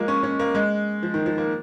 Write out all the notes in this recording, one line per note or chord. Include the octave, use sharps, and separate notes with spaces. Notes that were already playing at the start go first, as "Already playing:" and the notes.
Already playing: F3 G#3 A#3
C#4
C#4
A#3
G#3
F3
D#3
F3
A#3